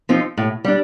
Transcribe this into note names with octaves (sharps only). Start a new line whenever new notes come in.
F3 C4 D#4
A2
G3 D4